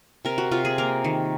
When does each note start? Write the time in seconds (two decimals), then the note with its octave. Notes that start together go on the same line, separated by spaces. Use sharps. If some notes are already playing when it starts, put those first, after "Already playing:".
0.25 C3 A#4
0.38 F#4
0.51 C3 F4
0.65 G#4
0.78 A#3 A#4
1.04 D#3